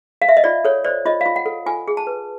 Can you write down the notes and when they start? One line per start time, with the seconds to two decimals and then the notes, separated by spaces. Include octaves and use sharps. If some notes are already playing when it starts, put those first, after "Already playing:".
0.22 F5
0.29 E5
0.37 D#5
0.44 F4 D5
0.65 A4 C#5
0.84 C5 D5
1.06 F4 D#5
1.21 F5
1.26 F4
1.36 F#5
1.46 A4
1.66 F4 G#5
1.88 G#4
1.97 A5
2.07 B4